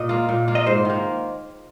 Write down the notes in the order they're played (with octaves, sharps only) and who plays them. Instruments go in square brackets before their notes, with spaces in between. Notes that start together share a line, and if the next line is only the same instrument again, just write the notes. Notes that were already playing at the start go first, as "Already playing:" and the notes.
Already playing: [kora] A#2 [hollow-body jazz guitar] D#5
[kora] A#3 F4
A#2
A#3 F4
[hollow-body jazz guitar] D#5
[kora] G#2 [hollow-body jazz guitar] C5
[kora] D#3 A#3